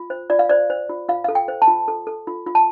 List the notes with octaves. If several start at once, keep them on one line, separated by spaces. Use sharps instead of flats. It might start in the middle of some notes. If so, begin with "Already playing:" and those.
Already playing: F4
C5
F4 D5
F5
C5 D5
C5
F4
F4 F5
A4 F5
G5
C5
A5
F4
A4
A4
F4
F4
A5